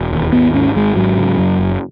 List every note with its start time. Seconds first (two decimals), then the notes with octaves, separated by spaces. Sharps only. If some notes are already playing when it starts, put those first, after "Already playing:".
Already playing: E1
0.12 D#2
0.32 G#1 B3
0.54 G#2 C#4
0.75 G#1 G#3
0.96 G#2 F#3
1.17 C#3
1.39 F#2
1.59 F#1